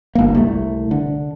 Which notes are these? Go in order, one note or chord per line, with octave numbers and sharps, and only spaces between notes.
G1 A#3
C2 A3
D3